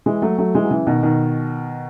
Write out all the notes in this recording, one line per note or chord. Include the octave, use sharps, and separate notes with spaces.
E3 G#3
F#3 A3
F#3 A3
E3 G#3
F#3
C#3 E3
B2 D#3
B2 D#3